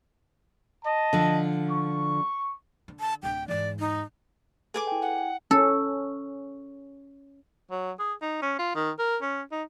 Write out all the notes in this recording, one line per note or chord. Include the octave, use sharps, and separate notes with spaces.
D#5 A5
D3 F3
C#6
D3
A5
D1 D3 G5
E2 G#2 D5
D#4
G#4 A4 B4 G#5 D6
E4 G5
F#5
C#4 A4
F#3
G#4
D#4
C#4
F4
D#3
A#4
C#4
D#4